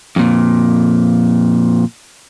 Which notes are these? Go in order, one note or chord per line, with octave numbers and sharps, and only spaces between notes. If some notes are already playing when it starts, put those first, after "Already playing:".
F2 A#2